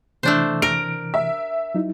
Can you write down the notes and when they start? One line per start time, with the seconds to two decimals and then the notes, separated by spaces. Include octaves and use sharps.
0.23 C3 E3 A3 D4 C5
0.62 A#4 D7
1.14 E5
1.75 F#3 D#4 E4